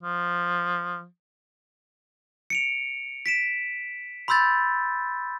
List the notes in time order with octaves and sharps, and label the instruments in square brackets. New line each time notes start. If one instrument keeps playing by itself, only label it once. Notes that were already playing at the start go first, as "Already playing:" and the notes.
[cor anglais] F3
[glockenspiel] C#7 D7 F7
B6 D7 E7
B5 C6 E6 G6 A6